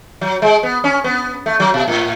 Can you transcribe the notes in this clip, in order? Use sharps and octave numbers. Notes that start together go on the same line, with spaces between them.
F#3
G#3
B3
C#4
B3
A3
F#3
B2
A2